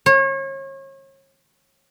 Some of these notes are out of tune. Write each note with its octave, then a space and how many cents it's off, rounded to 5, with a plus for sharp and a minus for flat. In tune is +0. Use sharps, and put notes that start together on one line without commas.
C#5 -35